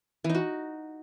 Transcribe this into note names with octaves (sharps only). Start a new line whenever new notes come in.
E3
D#4
F#4